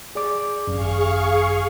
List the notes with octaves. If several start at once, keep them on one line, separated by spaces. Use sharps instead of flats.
G#4 D5 D6
G#1 F#2 G#4 F5 C#6